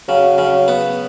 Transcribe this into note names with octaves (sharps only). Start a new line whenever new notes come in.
C#3 F#3
C#3
B3